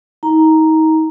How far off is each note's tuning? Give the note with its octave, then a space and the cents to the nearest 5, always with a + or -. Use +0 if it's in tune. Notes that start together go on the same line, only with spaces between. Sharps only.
D#4 +35 A#5 +0